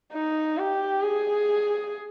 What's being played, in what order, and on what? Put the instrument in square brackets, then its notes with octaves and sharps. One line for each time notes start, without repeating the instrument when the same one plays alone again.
[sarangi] D#4
G4
G#4